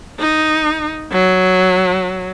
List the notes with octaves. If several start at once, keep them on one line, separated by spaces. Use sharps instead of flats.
D#4
F#3